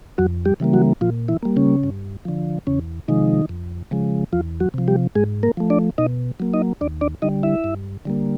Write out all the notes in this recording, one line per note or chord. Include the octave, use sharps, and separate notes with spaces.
F2 F#3 F#4
G3 G4
C#3 E3 G3 A#3
F#3 F#4
A#2 F3 F4
E3 E4
G3 A#3
C#3 C#4
G2
D3 F3
E2 C#3 C#4
C3 D#3 F3 G#3 D#4
F2
C#3 F3 G#3
E2 F3 F4
F#3 F#4
C3 F3
G3 G4
G#2 G#3 G#4
A#3 A#4
F3 A3
D4 D5
B2 D#4 D#5
F#3 A#3
D#4 D#5
D#2 D4 D5
D4 D5
D3 G3 D#4 D#5
E4 E5
G2
D3 G3 A#3